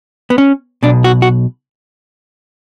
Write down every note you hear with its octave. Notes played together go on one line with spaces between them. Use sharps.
B3
C#4
B1 B2 D4
F#4
F#4